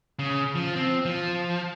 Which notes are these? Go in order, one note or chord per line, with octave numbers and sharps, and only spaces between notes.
C#3
F3
C4
F3